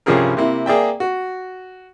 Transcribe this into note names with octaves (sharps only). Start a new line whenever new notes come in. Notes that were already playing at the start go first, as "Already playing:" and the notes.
C2 G2 F3 C#4 G#4 A#4
C3 A#3 E4
A#3 G#4 D5 E5 G5
F#4